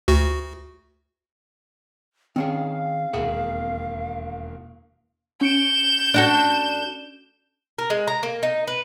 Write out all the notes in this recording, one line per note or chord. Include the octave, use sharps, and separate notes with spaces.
D2 F#4
D#3 C4 C#4 G#4 F5
E1 D#2 A#3 G#4 E5 F#5
C#4 G6 C#7 D7 E7
D4 F#4 A4
A#4
G#3
A#5
A#3
D#4
B4